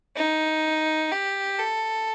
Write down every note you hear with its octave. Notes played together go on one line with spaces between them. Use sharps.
D#4
G4
A4